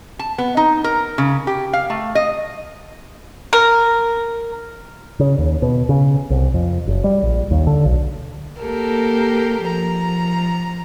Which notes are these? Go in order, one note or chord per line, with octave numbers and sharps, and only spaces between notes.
A5
B3
D#4
A#4
C#3
G4
F5
A3
D#5
A#4
C#3
D#2
B2
C#3
C2
F2
F#1
G3
A#1
D#2
D3
B1
A#3 G4 A4 A#4
F3 A#5